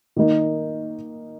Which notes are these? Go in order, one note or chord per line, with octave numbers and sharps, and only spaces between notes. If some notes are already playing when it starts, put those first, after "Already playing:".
D#3 A#3 D#4